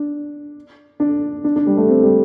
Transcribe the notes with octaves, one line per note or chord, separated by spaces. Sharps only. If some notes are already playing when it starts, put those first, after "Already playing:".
Already playing: D4
D4
D4
D4
G3
A3
C4
G3